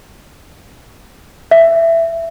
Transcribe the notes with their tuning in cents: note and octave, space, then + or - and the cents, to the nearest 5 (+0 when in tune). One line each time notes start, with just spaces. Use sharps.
E5 +10